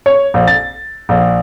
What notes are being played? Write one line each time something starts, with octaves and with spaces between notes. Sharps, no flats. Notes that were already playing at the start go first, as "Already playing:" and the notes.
C#5
A#1
A6
A#1